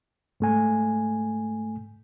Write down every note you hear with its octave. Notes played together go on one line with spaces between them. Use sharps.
G#2 A3 G#5